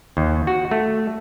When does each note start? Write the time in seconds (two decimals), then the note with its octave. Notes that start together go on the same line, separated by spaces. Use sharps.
0.17 D#2
0.47 F#4
0.71 A3